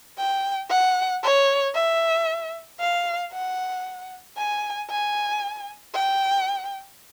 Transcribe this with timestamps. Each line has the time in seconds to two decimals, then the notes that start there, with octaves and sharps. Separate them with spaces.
0.18 G5
0.70 F#5
1.23 C#5
1.75 E5
2.80 F5
3.32 F#5
4.37 G#5
4.90 G#5
5.95 G5